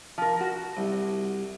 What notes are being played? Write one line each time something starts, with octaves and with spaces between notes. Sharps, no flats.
F3 A#4
F#4
C2